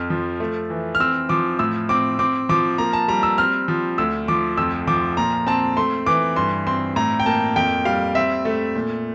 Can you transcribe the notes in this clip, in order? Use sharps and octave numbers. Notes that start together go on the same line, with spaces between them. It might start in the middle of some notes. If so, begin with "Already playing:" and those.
Already playing: F2 F6
F3
A3
E3
F6
C4 E6
F3 D6
A2 E6
C4 D6
C4 D6
F3 D6
A#3 A#5
A5
G3 A#5
E6
C4 F6
F3
D2 E6
F3 D6
F2 E6
F3 D6
A#2 A#5
C4 A5
A3 C6
E3 D6
G2 C6
C4 C6
A2 A#5
G5
A#3 A5
F2 G5
G3 F5
C4 E5
A3
A#2